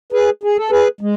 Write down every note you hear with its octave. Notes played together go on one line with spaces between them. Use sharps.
G#4 B4
G#4
A4
G#4 B4
G#3